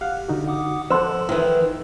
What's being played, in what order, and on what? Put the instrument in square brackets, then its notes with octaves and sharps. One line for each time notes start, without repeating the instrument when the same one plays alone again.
[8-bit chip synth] G4 [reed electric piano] F5 F#5
[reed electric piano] D3 D#4 F#4
[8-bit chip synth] F#5 D6 D#6
[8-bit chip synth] F3 [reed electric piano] A4 F#5 E6 [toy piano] C5 C6
[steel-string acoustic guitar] D#3 E3